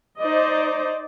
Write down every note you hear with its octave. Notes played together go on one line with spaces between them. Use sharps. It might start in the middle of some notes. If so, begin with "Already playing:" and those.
D#4 C5 D5 D#5